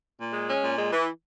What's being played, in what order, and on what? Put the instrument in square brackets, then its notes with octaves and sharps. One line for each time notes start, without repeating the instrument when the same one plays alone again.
[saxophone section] A#2
G#3
C#4
A#2
G#3
E3